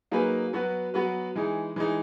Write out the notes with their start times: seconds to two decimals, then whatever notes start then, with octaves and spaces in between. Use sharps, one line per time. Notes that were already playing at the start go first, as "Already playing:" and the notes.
0.11 F#3 A#3 D#4 G#4 B4
0.53 F#3 B3 F#4 B4
0.94 F#3 B3 F#4 B4
1.36 E3 G#3 D#4
1.76 E3 G#3 D#4